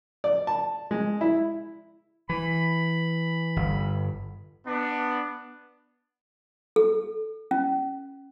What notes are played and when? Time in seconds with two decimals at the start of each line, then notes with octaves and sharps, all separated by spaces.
0.24 D5
0.47 A5
0.91 G#3
1.21 E4
2.29 E3 B5
3.56 G1
4.66 B3 D4
6.76 A4
7.51 C#4